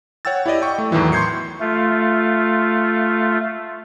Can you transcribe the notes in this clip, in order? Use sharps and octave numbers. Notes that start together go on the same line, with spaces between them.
C#5 F#5 G5 E6 A6
E4 G4 D5 D#5
G5 C#6
A3
E2 A2 D#3 E3 F#3
C6 C#6 G6 G#6 C7 C#7
A3 F4